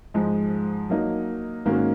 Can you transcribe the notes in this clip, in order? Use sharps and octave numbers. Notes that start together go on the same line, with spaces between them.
G#2 F3 G#3
F#3 A#3 D#4
G#2 D#3 A#3 C#4 F#4